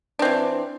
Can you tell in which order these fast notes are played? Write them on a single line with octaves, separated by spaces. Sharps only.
D4 C4 E3